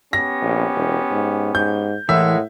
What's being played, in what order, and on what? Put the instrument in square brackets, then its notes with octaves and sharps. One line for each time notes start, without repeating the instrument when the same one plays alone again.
[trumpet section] B3 C#4 G4 [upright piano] A#6
[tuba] A#1
E1
G#2
[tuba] G#2 [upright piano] G6
[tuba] A2 [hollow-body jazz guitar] E3 [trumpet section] G#3 A#4 F#5 [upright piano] E5